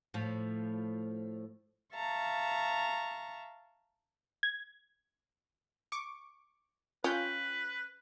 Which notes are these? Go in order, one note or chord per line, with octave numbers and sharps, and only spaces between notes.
A2 F3
E5 F5 A5 A#5 C#6
G#6
C#6 D6
C#4 F4 B4 G5 G6